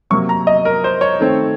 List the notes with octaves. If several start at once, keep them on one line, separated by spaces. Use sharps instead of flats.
C3 F#3 A#3 C#6
A#5
D#5
A#4
C5
C#5
D#3 A3 C4